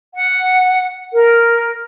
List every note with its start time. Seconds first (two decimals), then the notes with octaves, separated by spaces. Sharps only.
0.15 F#5
1.12 A#4